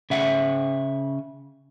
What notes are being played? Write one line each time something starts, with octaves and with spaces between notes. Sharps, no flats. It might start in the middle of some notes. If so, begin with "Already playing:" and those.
C#3 E5 F#5